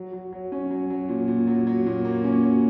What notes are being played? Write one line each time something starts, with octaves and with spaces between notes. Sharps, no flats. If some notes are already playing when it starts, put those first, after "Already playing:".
Already playing: F#3
F#3
F#3
C#4
F#3
F#3
A#2
A#2
F#3
F#3
A#2
A#3
C#4
F#3